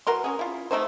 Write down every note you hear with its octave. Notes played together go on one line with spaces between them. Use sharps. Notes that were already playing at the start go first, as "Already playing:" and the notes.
E3 F#4 A#4 C6
C#4 G#4
E4 F4
C3 A3 D#4 C5